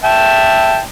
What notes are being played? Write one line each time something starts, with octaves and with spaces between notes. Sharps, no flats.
E5 G5 A5